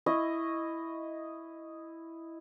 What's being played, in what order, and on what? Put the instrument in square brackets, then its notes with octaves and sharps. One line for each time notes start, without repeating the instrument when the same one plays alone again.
[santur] E4 D#5 C#6